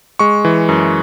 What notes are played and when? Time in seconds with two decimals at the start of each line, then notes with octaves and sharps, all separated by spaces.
0.19 G#3 C#6
0.45 E3
0.69 F#2